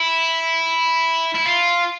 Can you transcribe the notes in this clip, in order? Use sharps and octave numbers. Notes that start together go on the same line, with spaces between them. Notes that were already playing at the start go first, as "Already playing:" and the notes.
Already playing: E4
E4
F4